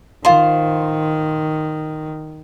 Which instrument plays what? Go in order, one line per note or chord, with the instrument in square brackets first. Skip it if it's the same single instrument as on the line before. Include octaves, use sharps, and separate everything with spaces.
[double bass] D#3 [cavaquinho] F4 C5